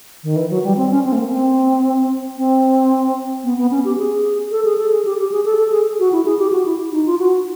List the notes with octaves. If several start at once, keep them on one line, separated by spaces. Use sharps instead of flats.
D#3
E3
F#3
G3
C4
C#4
C4
A3
A#3
C4
C4
B3
B3
C#4
G4
G#4
A4
G#4
A4
G#4
G4
G4
G#4
A4
A4
G#4
F#4
E4
G#4
G4
F#4
E4
D#4
F4
F#4